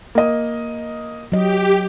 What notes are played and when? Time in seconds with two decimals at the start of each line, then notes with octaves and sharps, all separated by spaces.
0.15 A#3 D#5
1.32 F#3 G4 D#5